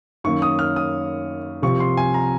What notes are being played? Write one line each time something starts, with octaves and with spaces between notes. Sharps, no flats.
F#2 D#3 A#3 C#4 C#6
D#6
F6
D#6
C2 C3 F3 C4 C#6
C6
G#5
A#5